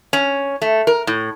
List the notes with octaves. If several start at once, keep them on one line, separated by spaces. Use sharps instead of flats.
C#4
A3
A#4
A2